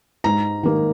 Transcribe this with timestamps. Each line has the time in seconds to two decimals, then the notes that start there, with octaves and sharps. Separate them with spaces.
0.24 G#2 A#5
0.63 D#3 A#3